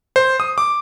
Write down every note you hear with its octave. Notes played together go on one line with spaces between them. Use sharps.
C5
D#6
D6